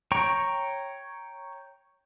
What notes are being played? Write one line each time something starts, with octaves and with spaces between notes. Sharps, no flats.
C#5 G5 A#5 C#6